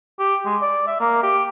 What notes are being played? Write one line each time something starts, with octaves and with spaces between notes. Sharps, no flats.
G4
G#3
D5
E5
A#3
G4